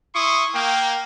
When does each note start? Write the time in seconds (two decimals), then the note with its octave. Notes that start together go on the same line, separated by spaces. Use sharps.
0.15 E4 C6 C#6 D#6
0.54 A#3 G5